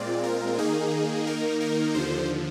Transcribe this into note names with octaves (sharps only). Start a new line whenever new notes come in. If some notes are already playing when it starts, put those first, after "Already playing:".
Already playing: A#2 G#3 C4 F4 D5
A#4
D#3 A#3 D#4 G#4
A#4
A#4
D#2 D3 F3 C5